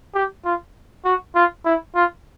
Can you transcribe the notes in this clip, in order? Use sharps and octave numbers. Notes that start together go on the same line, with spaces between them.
G4
F4
F#4
F4
E4
F4